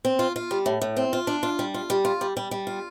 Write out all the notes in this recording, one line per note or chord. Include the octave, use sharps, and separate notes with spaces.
C4
F4
F4
G3
A2
A2
C4
F4
D4
F4
G3
F4
G3
F4
G3
G3
G3
F4